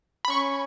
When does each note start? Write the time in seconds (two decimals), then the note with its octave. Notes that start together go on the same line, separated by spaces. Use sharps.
0.25 B5
0.30 C#4 C#6